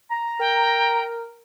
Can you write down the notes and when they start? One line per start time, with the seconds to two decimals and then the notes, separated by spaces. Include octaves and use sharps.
0.11 A#5
0.40 A#4 G5